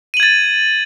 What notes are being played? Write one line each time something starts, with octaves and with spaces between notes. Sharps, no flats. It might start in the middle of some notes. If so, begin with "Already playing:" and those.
G#6 A6 D#7 F#7